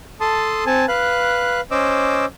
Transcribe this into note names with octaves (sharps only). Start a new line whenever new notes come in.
A4 A5 C6 D#6
C4 G#5 A5
B4 F5 F#6
C#4 C5 D#5 D6 E6